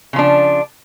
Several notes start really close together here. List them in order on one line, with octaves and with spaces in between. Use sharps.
C#3 F3 D4